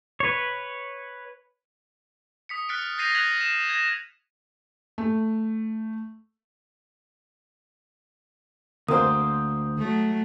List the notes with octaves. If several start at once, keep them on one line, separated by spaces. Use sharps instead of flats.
B4 C#5
D#6 B6 C#7
F6 F#6 A6 B6 C#7 D7
G6 A6 A#6 C7 D#7 F7
F#6 G#6 B6 F7 F#7
E7
G#6 A#6 E7
A3
D2 A#3 C4 C5 D#6
F#3 A3